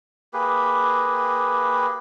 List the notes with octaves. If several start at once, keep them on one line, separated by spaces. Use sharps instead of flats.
A#3 G4 G#4 B4